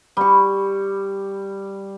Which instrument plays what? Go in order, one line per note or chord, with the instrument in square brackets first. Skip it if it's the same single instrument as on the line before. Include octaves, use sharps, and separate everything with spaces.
[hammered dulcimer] G3 C#6